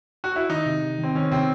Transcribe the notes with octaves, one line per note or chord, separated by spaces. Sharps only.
F#4
E4
D#3 D#4
C3
C3
D#3
C4
D#3 C#4
C3 C4